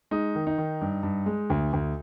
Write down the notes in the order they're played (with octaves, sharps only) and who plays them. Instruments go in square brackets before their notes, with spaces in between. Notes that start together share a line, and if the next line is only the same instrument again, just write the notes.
[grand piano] G#3 D#4
D#3
D#4
D#3
G2
G2
G#3
D2
D2